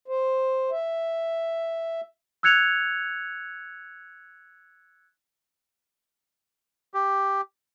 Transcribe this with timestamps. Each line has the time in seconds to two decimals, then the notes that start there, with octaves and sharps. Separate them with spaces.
0.08 C5
0.71 E5
2.43 E6 F#6 G#6 C#7 F7
6.94 G4